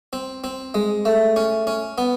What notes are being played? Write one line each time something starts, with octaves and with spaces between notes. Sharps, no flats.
C4
C4
G#3
A3
C#4
C#4
B3